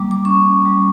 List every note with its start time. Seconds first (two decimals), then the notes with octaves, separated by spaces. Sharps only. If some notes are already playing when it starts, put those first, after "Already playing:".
Already playing: G3 A#3 D6
0.11 D6
0.25 C#4 C#6
0.65 G3